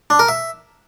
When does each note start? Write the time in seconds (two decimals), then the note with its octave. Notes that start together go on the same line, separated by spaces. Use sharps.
0.10 D4
0.19 A#4
0.28 E5